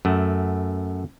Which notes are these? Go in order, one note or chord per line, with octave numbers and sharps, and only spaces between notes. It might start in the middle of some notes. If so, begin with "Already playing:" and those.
F#2 A3